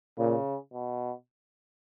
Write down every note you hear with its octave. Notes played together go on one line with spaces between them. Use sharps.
A#2 C#3
B2